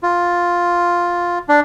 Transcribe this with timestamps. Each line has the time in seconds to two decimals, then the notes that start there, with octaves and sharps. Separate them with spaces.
0.03 F4
1.49 D4